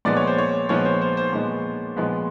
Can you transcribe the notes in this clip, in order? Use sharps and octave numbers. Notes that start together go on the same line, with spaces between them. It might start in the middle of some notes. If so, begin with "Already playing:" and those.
A#2 F3 G#3 B3 D5
C#5
C5
C#5
A#2 F3 G#3 B3 C#5
C5
C5
C5
A#2 F3 G#3 B3
A#2 F3 G#3 B3